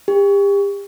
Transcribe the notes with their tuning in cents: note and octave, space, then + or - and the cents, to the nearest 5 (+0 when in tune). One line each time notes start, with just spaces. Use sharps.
G4 +35